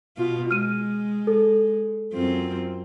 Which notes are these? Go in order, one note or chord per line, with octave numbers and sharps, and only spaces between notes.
B2 F4
G#3 F6 D#7
A4
F#2 C4 F4